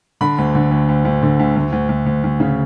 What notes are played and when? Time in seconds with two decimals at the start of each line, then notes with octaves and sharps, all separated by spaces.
0.21 D3 B5
0.38 D2
0.55 D3
0.71 D2
0.89 D2
1.05 D2
1.22 D3
1.39 D2
1.56 D2
1.72 D2
1.89 D2
2.06 D2
2.24 D2
2.40 C#3